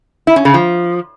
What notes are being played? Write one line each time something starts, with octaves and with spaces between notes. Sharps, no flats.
E4
C#4
C#3
F3